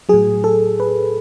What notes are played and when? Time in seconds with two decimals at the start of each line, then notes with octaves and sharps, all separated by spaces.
0.09 A2 F#3 G#4
0.44 A4
0.80 B4